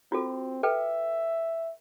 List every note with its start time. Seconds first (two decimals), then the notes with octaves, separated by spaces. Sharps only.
0.12 C4 F4 F#4 A4
0.63 A4 B4 E5 G5